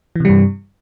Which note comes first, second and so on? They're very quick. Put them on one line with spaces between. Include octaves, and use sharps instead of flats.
E3 C3 G3 G2